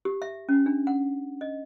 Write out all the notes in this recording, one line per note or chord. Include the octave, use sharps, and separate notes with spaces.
G4
E5
C#4
D4
F#5
D#5